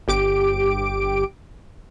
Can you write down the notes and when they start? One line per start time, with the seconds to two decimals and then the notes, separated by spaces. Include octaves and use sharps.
0.08 G1 G4 D6 D7